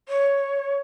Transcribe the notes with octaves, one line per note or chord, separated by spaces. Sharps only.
C#5